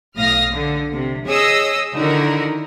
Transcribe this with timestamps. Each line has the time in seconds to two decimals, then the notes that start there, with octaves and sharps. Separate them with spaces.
0.17 B1 A2 F5 D#6 F6 A#6
0.52 D3
0.93 C3
1.27 G#4 C#5 D#5 D#6 E6
1.94 D3 D#3 D#4 E4 F#4 A#4